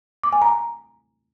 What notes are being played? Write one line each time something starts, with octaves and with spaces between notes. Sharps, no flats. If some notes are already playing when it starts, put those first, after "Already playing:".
D6
G#5
A#5